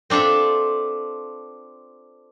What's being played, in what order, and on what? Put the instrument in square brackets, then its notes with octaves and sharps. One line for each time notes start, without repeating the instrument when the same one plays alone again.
[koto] C4 D4 F4 A4 E5